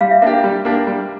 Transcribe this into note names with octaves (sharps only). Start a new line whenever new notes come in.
G3 F5
E5
A#3 D4 G4 E5
G3
A#3 D4 G4
G3